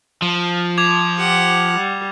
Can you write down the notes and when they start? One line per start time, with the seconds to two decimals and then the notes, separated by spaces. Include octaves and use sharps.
0.22 F3
0.78 D6 G#6 F7
1.17 G4 F#5 C#6
1.76 G3